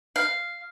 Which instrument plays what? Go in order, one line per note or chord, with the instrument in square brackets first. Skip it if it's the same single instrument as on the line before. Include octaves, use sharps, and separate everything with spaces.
[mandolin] F5